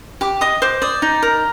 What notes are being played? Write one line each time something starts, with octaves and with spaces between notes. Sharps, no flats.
G4 D6
D#5 D#6
C5 D6
D5 D#6
D#4
A#4